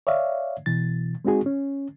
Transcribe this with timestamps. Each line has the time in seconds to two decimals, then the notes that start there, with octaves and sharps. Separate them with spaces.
0.07 C#5 D5 E5 F5
0.66 B2 E3 A6
1.25 G#3 C4 D#4 F#4 G#4
1.46 C#4